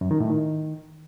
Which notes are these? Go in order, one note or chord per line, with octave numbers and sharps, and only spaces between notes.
F#2
D#3
A2
D#3